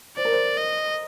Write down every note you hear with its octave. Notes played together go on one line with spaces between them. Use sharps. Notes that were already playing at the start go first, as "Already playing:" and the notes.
C5 D5
A#4
C5
D#5